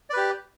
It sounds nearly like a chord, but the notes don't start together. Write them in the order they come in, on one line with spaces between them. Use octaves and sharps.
D5 B4 G4